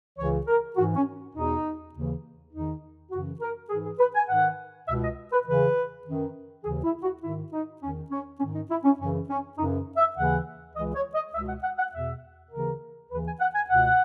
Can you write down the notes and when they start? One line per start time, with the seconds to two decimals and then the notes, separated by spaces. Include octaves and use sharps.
0.17 C#2 C#3 E3 C#5
0.46 A#4
0.75 G#2 E3 F#4
0.95 C#4
1.35 E2 B2 D#4
1.93 D#2 C#3 E3
2.52 E2 D#3 D#4
3.11 F#2 C#3 E3 F#4
3.40 A#4
3.69 G#2 E3 G#4
3.84 G#4
3.99 B4
4.14 G#5
4.28 G#2 D#3 F#5
4.87 B2 E5
4.91 C#2
5.01 D#5
5.31 B4
5.46 E2 C#3 E3 B4
6.05 F#2 D#3
6.63 D#2 C#3 E3 G#4
6.84 E4
7.03 F#4
7.22 G#2 D#3 E4
7.52 D#4
7.81 E2 D#3 C#4
8.11 C#4
8.40 G#2 D#3 C#4
8.55 D#4
8.70 E4
8.84 C#4
8.99 F#2 C#3 E3 C#4
9.28 C#4
9.57 F#2 C#3 E3 D#4
9.97 E5
10.16 D#2 C#3 E3 F#5
10.75 C#2 C#3 E3 D#5
10.95 C#5
11.14 D#5
11.34 C#2 E5
11.37 B2
11.48 F#5
11.63 F#5
11.78 F#5
11.93 E2 B2 E5
12.51 D#2 C#3 E3 A#4
13.10 D#2 C#3 E3 B4
13.25 G#5
13.40 F#5
13.54 G#5
13.69 C#2 B2 F#5